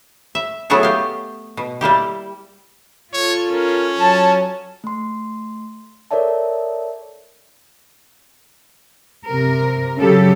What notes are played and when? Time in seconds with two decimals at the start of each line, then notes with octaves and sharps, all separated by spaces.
0.35 E5
0.70 F#3 A3 B3 E4 G#4 C#5
0.83 G4 F5
1.57 B2
1.81 G3 A#3 E4 G4
3.13 F4 A4 C#5
3.48 C#4 A#4
3.98 F#3 A5
4.84 A3 C6
6.11 A4 A#4 C#5 D5 E5 A5
9.27 C3 A#4
9.98 C#3 F#3 G4 A4